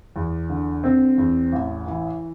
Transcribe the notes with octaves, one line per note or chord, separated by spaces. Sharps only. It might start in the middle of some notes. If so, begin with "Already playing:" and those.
E2
D3
C4
E2
A1
E3